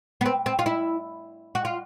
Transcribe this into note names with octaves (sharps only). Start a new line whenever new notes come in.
B3
C4
C4
F4
E4
F#4
F4